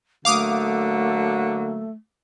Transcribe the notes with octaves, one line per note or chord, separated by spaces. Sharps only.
D3 F#3 A3 A#3 F5 D6 D#6